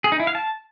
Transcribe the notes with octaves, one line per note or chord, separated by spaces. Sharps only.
G#4
D#4
E4
F5
A5